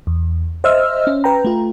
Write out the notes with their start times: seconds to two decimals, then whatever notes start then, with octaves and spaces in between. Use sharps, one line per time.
0.07 E2
0.64 C5 D#5 E5 E6 F6
1.07 C#4
1.24 B4 G5 A#5
1.45 A3 F4